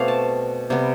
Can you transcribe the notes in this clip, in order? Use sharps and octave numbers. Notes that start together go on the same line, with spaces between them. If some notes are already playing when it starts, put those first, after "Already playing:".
Already playing: B2 A3 C4 D5 F5
A5
C3 G3 B3